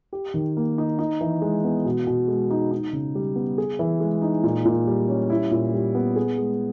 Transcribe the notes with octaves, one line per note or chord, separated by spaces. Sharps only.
G4
D#3
A#3
D#4
D#4
E3
G#3
B3
B2
B2
G#3
D#4
D#4
C#3
G3
B3
G#4
E3
G#3
D#4
A#2
A#2
G3
C#4
E4
A#2
G3
B3
G#4
G#3